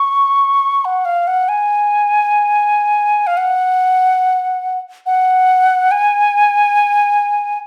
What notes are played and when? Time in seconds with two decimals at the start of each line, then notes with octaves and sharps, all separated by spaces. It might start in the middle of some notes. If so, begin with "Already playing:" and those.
Already playing: C#6
0.85 F#5
1.05 F5
1.27 F#5
1.49 G#5
3.27 F5
3.37 F#5
5.06 F#5
5.91 G#5